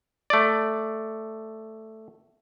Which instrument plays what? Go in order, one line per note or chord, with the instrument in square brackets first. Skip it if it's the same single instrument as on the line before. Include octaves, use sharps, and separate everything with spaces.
[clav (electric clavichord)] A3 D5